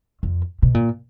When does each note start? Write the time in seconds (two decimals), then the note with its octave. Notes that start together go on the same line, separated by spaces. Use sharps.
0.23 F2
0.62 B2
0.74 A#2